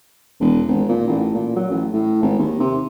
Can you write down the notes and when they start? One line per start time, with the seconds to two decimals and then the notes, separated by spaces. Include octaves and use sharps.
0.40 E1
0.68 G#1
0.89 A#2
1.07 A1
1.34 A#2
1.56 F#3
1.70 A1
1.93 A2
2.22 G#1
2.39 D#2
2.60 C3